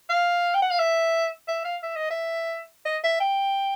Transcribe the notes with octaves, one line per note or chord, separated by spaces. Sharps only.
F5
G5
F#5
F5
E5
E5
F5
E5
D#5
E5
D#5
E5
G5